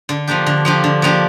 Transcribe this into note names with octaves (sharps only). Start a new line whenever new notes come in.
D3
F3 A#3 D4 G4
D3
F3 A#3 D4 G4
D3
F3 A#3 D4 G4